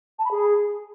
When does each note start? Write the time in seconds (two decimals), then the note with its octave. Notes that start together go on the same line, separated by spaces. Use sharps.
0.19 A5
0.25 B5
0.31 G#4